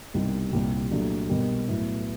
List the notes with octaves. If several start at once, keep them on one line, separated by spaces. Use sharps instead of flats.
C2 B2 G3 A#3 D#4
C2 A#2 G3
A#2 F#3 A3 D4 G4
B1 B2 G3 A#3
A2 F#3 B3 E4